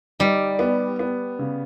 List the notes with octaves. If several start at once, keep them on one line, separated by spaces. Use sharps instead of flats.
G3 D#4
B3
B3
C#3